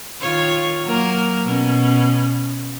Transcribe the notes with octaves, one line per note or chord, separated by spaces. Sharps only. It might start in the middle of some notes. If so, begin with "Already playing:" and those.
D#3 F4 C#5
F#3 A#3 A#4
B2 C#4